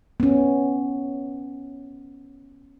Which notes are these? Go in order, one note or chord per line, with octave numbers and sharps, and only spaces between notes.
B3 C#4